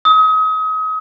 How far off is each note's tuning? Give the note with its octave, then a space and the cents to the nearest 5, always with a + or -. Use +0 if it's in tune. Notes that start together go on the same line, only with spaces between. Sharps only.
D#6 +35